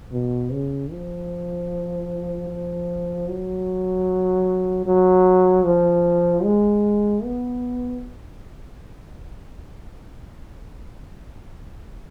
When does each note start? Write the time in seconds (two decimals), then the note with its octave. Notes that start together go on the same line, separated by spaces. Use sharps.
0.12 B2
0.52 C#3
0.91 F3
2.49 F3
3.28 F#3
4.86 F#3
5.65 F3
6.44 G#3
7.24 B3